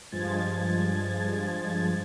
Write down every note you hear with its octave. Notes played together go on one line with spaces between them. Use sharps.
G2 F3 G#3 G#6 A6